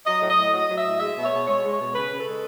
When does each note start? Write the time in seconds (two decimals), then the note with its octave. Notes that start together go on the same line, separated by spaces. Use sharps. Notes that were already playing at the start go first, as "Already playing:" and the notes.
0.05 F#3 D#5
0.22 A2
0.29 D#5
0.37 A2
0.53 F#3 D#5
0.68 F#3
0.77 E5
0.85 A2
1.00 G#3 E5
1.15 B2
1.24 C#5
1.32 B2
1.47 G#3 C#5
1.62 G#3
1.71 C#5
1.79 B2
1.94 C#3 B4
2.10 C#3
2.18 A4
2.25 G#3